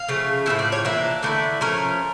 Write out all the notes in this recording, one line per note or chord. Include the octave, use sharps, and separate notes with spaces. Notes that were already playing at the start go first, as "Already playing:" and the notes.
Already playing: F5
C#3 F3 A3
A2 F3 C#4 E4 E5
D5
C#5
E3 A#3 D4 E5
D3 A3 E4 D5
F3 A3 C#4 A#4